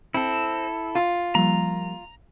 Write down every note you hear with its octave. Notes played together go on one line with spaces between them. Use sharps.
C4 E4 A4
F4
F3 G3 A#3 A#5